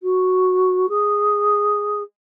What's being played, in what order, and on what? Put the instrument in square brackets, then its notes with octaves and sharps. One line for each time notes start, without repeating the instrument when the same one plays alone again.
[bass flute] F#4
G#4